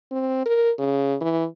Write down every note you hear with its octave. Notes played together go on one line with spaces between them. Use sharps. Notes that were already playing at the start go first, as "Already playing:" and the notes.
C4
A#4
C#3
E3